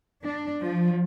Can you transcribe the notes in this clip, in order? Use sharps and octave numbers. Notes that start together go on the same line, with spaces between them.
D4
F3